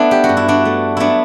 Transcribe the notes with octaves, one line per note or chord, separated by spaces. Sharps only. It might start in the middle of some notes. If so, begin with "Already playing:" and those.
Already playing: A3 B3 D4 E4
G4
F#4
G2
E4
D4 F#4
A3
F#3 B3 D4 E4